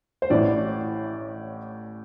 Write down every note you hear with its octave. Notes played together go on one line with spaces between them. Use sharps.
C5
A1 A2 E3 D5